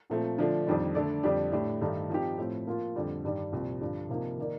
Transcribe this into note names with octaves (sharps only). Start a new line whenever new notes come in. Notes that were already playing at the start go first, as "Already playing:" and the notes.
A#2 F3 A3 C4
D3 F3 A3 D4
F2 D#3 G3 D4
D3 A3 D4 A4 D5
F2 D3 G3 D4 G4
A2 A3 D4 G4
G2 D#3 A3 D#4
F3 C4 D#4 G4
A2 F3 C4
F3 A#3 F4
F2 D3 G3
G2 D#3 G3
C2 A#2 F3 C4
G2 D3 F3
C3 F3 A#3 D#4 A#4
D#3 A#3 D#4 A#4 D5